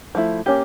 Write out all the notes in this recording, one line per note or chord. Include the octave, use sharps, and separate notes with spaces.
F3 A3 E4
A#3 C#4 G4